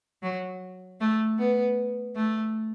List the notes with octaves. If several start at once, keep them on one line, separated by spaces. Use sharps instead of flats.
F#3
A3
B3
A3